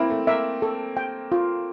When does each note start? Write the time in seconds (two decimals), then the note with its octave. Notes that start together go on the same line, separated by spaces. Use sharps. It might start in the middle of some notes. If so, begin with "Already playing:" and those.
Already playing: A#3 C4 E4
0.10 A3
0.27 A#3 E5
0.62 A4
0.97 G5
1.32 F4